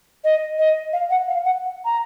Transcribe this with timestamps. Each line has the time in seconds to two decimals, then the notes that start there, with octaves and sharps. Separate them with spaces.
0.24 D#5
0.58 D#5
0.93 F5
1.10 F#5
1.28 F5
1.45 F#5
1.85 A#5